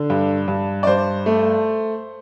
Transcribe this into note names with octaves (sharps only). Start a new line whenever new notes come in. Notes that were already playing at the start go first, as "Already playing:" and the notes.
Already playing: D3
G2
G2
D5
G2 C5
A3